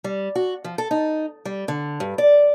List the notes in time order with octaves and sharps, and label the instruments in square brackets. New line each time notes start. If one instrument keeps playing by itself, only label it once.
[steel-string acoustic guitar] G3
F#4
F3
A4
D#4
G3
D3
G2
D5